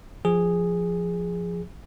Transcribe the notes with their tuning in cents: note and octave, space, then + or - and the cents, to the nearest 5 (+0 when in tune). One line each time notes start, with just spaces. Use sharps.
F3 +0 G#4 -5